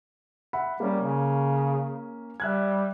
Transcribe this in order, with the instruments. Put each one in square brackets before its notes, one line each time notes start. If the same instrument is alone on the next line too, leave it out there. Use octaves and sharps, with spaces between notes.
[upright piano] E5 F#5 B5
[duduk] G3 [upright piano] A#3 C#4
[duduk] C#3
[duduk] G3 [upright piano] E5 F#6 G#6